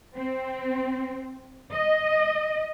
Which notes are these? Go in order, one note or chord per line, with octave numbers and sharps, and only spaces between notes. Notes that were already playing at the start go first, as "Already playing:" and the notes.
C4
D#5